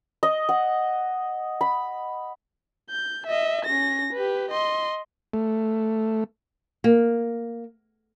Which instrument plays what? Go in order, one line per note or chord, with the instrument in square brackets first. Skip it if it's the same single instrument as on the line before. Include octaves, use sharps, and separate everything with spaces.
[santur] D#5
F#5
B5
[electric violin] G6
D#5 E5
C#4 A#6
G4 B4
D#5 C6
[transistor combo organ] A3
[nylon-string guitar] A#3